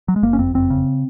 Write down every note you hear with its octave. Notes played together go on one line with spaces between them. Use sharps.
F#3
G#3
F#1 A#3
C#4
F2 C4
F#1 C4
C#3